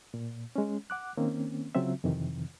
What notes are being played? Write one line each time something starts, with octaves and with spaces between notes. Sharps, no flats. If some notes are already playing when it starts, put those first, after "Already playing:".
A#2
G#3 C#4
F#5 D6 F#6
D#3 A#3 C4 C#4
C#3 F#3 C4 F4 E5
F2 C3 D#3 E3